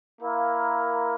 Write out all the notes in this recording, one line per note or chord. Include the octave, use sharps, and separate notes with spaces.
A#3 E4 A#4 F5